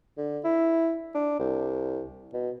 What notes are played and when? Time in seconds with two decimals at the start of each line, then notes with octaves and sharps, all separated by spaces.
0.17 D3
0.44 E4
1.15 D4
1.39 C2
2.33 B2